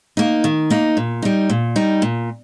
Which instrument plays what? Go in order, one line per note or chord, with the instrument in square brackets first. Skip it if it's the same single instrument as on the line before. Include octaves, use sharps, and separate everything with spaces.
[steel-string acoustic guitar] A#3 D#4
D#3
A#3 D#4
A#2
G3 D#4
A#2
G3 D#4
A#2